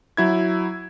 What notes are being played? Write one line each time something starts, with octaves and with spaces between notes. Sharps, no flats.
F#3 E4 G#6